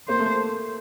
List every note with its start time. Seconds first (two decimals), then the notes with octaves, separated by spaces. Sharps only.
0.08 A#3 C5
0.19 A3